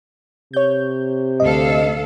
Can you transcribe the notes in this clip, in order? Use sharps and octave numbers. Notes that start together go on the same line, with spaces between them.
C3 C#5 G6
D2 A4 D#5 F5